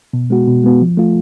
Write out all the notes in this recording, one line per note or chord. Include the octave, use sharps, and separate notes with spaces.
B2
G#3 B3 F#4
B2
G#3 B3 F#4
F3
A3 F4